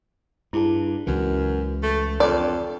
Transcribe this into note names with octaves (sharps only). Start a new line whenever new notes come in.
G2 E4 G#4 A5
C#2 F#2 E3
A3
F2 D4 C#5 D5 D6